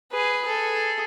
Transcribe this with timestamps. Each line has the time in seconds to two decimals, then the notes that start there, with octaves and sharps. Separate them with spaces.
0.12 G#4 B4
0.45 G#4 A4